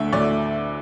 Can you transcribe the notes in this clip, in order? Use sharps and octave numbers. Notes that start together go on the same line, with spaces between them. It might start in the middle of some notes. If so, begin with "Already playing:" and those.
Already playing: D2 D3 A3 E5
D2 D3 A3 D5